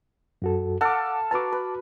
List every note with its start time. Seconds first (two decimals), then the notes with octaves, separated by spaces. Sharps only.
0.42 F#2 F#4 A4
0.81 A4 F5 F#5 D6
1.31 F#4 B4 A5 A#5 D6
1.52 B4